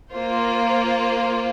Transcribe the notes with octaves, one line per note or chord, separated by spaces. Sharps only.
A#3 F4 C5